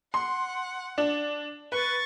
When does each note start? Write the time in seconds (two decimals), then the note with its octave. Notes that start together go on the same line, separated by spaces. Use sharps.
0.14 F#5 C6
0.98 D4
1.72 B4 C#6 A6